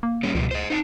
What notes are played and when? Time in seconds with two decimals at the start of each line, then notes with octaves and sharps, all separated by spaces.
0.03 A#3
0.23 G3 G#3 C#4
0.35 C#2 B2 F3 G3
0.51 C5 D#5
0.70 D#4 F5 A5